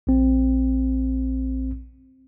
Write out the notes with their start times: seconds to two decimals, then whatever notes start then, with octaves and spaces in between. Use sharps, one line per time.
0.07 A#1 C4